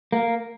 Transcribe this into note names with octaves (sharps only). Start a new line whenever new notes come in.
A#3